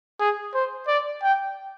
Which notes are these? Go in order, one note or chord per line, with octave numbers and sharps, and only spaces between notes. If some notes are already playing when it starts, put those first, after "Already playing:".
G#4
C5
D5
G5